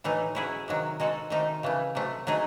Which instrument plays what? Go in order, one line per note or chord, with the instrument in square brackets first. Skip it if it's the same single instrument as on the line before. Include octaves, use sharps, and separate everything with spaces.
[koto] A2 E3 A3 D#4
F#3 C#4 E4 G#4
C3 D#3 F#3
G#3 D#4 F#4 A4
C3 D#3 A3 D#4 A4
C#3 E3 A3
C3 F#3 A3
F#3 A3 D#4 G#4